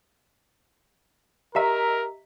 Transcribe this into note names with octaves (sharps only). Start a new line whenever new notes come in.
G4 A#4 D#5 E5 A#5